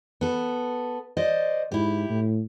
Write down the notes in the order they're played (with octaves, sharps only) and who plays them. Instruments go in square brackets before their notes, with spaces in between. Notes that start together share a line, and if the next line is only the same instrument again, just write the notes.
[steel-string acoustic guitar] B3 A4
C5 D5 D#5
[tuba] G#2 [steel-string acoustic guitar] E4 G4
[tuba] A2